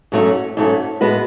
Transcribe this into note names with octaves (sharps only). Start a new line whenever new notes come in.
G#2 F#3 A3 C#4
G#2 F#3 A3 C#4
A2 G#3 B3 F#4 B4